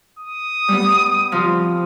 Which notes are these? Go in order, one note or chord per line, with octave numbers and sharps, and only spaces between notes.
D#6
G3 B3
C3 F3 C6